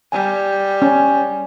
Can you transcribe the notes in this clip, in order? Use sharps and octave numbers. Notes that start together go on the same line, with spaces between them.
G3 G#5
C#4